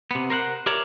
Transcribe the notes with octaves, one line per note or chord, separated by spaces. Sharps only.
C3 B3
A#4 C5 F5 F#5
G4 A#4 C#5 D5 E5 A#5